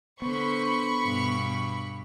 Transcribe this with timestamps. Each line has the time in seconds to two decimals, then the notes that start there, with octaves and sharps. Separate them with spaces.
0.22 D3 B3 C5 B5 C#6
1.05 G2 B2